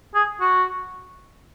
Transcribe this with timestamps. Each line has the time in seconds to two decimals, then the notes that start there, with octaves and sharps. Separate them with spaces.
0.15 G#4
0.41 F#4